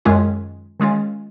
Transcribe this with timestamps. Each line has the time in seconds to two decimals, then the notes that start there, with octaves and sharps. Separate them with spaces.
0.05 F#2 D#3 G#3 C#4 F4
0.80 D#3 G#3 C#4 F4